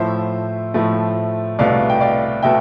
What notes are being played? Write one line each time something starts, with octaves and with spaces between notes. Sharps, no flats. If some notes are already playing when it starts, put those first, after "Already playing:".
Already playing: A2 F3 A3 C5 E5
A2 F3 A3
C2 B2 A3 D5 F5
G5
D5 F5
B2 A3 E5 G5